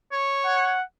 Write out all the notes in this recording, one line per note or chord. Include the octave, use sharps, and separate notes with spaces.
C#5
F#5